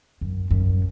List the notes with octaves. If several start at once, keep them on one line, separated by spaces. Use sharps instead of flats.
F#2
F#2